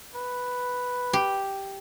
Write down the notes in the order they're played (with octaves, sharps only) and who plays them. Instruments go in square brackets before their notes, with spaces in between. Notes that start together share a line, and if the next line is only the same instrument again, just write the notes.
[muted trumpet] B4
[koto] G4